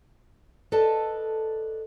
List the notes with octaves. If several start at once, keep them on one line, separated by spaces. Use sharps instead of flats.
A4 B4 D5 D#5 A5